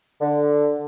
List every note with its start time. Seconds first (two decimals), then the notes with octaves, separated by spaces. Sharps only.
0.21 D3